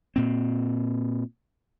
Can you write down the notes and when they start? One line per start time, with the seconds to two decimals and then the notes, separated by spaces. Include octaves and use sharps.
0.16 A#2 C4